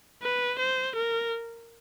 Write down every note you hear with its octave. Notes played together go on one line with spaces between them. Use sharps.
B4
C5
A#4